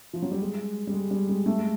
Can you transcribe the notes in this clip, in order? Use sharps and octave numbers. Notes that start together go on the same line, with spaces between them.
F3
F#3
G3
G#3
G3
G#3
G3
G#3
A3
G#3